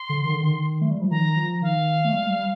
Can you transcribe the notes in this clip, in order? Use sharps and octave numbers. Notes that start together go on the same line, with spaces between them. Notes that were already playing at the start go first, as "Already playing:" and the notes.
Already playing: C6
D3
D#3
D3
D#3
A3
G3
F3
D#3 A#5
F3
D#3 F5
A3
G3
G3